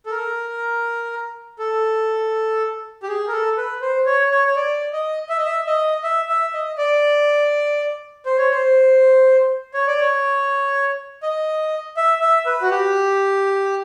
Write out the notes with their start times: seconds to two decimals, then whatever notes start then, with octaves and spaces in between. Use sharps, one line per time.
0.06 A4
0.11 A#4
1.59 A4
3.03 G4
3.08 G#4
3.28 A#4
3.32 A4
3.57 B4
3.82 C5
4.06 C#5
4.31 C#5
4.48 C#5
4.56 D5
4.93 D#5
5.29 E5
5.38 D#5
5.45 E5
5.67 D#5
6.04 E5
6.29 E5
6.54 D#5
6.78 D5
8.26 C5
8.38 C#5
8.50 C5
9.74 C#5
9.87 D5
9.99 C#5
11.23 D#5
11.97 E5
12.21 E5
12.46 B4
12.62 F#4
12.71 G4